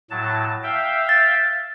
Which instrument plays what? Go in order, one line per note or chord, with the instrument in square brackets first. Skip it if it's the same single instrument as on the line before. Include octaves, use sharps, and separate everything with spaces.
[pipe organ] A2 F#3 A5
E5 F5 G5
[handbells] A6